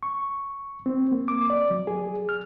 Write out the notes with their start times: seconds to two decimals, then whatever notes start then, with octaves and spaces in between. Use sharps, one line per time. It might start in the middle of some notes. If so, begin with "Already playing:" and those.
0.03 C#6
0.86 C4
1.12 A#3
1.28 D6
1.50 D5
1.70 F#3
1.87 G#4
2.29 F6